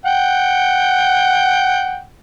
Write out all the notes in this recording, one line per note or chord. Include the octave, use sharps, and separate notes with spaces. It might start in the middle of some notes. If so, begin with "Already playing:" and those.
F#5 G5